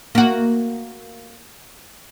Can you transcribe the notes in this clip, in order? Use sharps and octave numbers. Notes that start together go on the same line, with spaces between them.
A#3 F#4